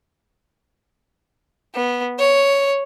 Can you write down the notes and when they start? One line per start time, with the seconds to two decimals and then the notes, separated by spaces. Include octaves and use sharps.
1.75 B3
2.19 C#5